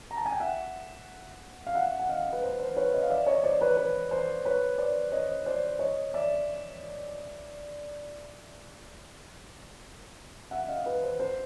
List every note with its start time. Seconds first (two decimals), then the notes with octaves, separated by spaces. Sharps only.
0.11 A#5
0.17 A5
0.26 G#5
0.32 G5
0.40 E5 F#5
1.67 F5
1.75 E5 F#5
1.99 F#5
2.09 D#5 F5
2.32 B4
2.43 C5
2.60 C5
2.76 B4 C#5
2.93 C#5 D#5
3.02 F5
3.10 D5 E5
3.26 C#5 D#5
3.43 C5 D5
3.61 B4 C#5
3.77 B4
4.11 C5
4.45 B4 C#5
4.78 C5 D5
5.12 C#5 D#5
5.46 C5 D5
5.79 C#5 D#5
6.14 D5 E5
10.51 E5 F#5
10.68 D#5 F5
10.86 B4
11.03 C5
11.20 C5